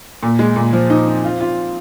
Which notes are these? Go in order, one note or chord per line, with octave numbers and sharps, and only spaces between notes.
A#2
G#3
A#2
F3
D#4
C4
F4
F4